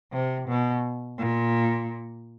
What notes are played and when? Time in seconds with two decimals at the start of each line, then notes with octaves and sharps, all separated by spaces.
0.12 C3
0.48 B2
1.18 A#2